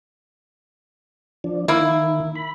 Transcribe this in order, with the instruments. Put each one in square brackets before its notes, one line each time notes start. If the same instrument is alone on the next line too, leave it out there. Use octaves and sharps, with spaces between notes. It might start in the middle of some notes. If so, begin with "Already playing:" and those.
[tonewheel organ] F3 D4
[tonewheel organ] D#3 [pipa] A#3 E4
[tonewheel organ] B5